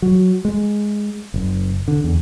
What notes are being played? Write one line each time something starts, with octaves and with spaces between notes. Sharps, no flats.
F#3
G#3
F#1
D3
E2